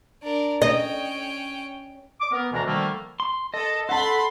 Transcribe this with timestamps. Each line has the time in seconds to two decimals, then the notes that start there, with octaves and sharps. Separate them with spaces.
0.23 D4 A#4
0.62 C#4 D#5 G5
2.21 D6
2.32 B3 A#4
2.53 D2 B2 E3 G#3 D4 A#5
2.65 D3 D#3 F3 G3 A3 A#3
3.20 C6
3.54 A4 D#5
3.89 A4 F#5 A5 B5 C6